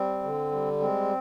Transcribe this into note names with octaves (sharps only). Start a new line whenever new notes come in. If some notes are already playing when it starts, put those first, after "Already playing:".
Already playing: G3 C4
D3
G3
G#3 C4